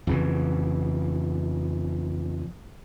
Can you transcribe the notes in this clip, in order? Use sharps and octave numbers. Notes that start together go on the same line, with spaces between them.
F2 C#3 E3